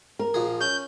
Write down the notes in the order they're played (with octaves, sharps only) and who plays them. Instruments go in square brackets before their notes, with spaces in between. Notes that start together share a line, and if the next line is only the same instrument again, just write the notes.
[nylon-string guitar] A#4
[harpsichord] A#1 F3 G#4
[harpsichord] C#4 [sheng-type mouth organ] G6